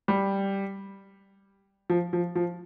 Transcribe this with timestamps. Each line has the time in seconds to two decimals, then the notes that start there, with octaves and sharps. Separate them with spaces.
0.08 G3
1.90 F3
2.13 F3
2.35 F3